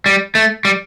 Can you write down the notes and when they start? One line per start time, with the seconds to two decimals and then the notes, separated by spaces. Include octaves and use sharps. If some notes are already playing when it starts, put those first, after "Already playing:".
0.06 G3
0.35 A3
0.65 G3